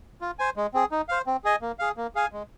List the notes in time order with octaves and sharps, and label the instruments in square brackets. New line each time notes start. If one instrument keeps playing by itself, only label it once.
[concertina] F4
C5 G#5
G#3
C4 G#4
D#4
C5 F5
C4
G#4 D#5 G#5
A#3
G#4 F5
A#3
G#4 F5 G#5
G#3